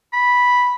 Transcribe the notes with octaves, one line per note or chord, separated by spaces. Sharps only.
B5